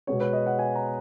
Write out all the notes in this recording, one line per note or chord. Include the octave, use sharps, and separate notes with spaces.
B2 G#3 B3 C#5
B4
D#5
F#5
G#5
A#5